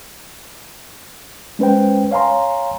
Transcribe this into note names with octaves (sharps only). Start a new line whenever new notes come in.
G#3 C#4 B4 C5 G5
C#5 F5 G#5 A#5 C6